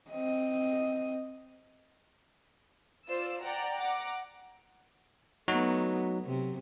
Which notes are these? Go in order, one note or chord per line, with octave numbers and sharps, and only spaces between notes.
C4 D#5
F4 C5 D5 E6
D5 F#5 G5 A#5
F#5 A#5 D6
F#3 A3 B3 D#4 F#4
C3 F#3